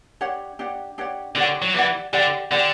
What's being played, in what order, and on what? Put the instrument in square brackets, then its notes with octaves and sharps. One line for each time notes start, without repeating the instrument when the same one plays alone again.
[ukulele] D4 G4 C#5 F#5
D4 G4 C#5 F#5
D4 G4 C#5 F#5
[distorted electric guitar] D3 [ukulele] D4 G4 C#5 F#5
[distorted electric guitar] F#3
[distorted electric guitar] E3 [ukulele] G4 D5 F#5
[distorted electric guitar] D3 [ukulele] G4 D5 F#5
[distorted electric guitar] D3 [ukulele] G4 D5 F#5